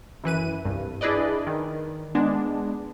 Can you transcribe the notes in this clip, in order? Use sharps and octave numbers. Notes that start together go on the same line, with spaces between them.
F#2 E3 B4 D#7
C2 G2
D4 E4 G#4 B4 D5 D#5
D#3
G#3 B3 D4